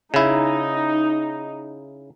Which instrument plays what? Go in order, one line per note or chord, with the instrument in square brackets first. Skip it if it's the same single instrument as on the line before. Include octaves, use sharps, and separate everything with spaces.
[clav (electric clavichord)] C#3 E4 [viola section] D#4